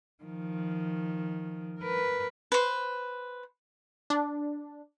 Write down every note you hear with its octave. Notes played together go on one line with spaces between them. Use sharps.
D#3 F3
A#4 B4
B4 C5
D4